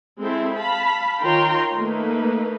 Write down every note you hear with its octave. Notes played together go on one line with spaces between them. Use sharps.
G#3 C4 E4 A4
F5 A5 B5
D#3 F4 C#5 G5 A#5 C6
A3 A#3 D#4 B4